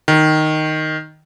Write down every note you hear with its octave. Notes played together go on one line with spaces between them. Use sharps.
D#3